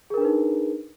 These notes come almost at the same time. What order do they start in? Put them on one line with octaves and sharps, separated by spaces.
G#4 A#4 D4 B4 D#4